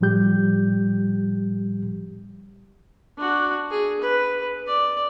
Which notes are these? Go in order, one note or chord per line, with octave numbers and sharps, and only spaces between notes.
A2 F3 G3 G4 G6
D4 F#4
G#4
B4
D5